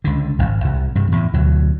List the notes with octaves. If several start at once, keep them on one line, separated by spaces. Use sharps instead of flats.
C#2 D3
D#1 G#1
C2
G2 C3
E2 A2
D2 B2 F#3